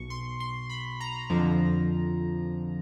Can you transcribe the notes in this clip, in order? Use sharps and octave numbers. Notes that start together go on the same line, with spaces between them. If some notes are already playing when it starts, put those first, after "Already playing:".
Already playing: B1 B2 C#6
C6
C6
B5
A#5
F2 D3 F3